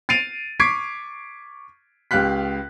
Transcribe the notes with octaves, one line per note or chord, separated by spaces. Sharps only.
A6 C7 D7 D#7 F7
C#6 D6 G#6 B6 C7 D7
C#2 G4 F5 F#6 B6